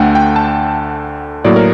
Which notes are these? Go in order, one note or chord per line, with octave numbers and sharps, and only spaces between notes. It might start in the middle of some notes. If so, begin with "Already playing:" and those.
Already playing: D2 D3 A3 D4 F#5 G5
G5
A5
A2 F#3 A#3 D5
A#4